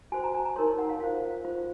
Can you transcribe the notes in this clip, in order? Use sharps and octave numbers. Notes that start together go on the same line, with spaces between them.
F#4 C5 G#5
A#5
G#5
A#5
D#4 A#4 C#5 C6
C6
F#5
F5
F4 C5 F5
F4 C5